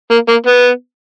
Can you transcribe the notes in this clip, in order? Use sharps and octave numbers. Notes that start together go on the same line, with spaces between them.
A#3
A#3
B3